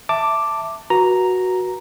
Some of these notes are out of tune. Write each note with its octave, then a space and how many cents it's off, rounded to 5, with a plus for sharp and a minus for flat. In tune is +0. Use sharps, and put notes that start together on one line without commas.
E5 +0 A5 +15 D6 +0
F#4 +0 B4 -30 A#5 +0